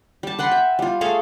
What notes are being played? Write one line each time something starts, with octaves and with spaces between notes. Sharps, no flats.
G3 A5
B4 F#5 G5 C6
E5
G3 F4
A3 G#4 A4 F5